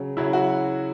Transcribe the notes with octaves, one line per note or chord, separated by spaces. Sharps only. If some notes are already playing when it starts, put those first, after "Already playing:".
Already playing: C#3 F#3
C#3 F#3 E4
F#4